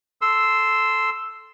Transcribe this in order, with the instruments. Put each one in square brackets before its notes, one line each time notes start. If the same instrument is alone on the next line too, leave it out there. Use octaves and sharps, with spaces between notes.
[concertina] A4 C6 E6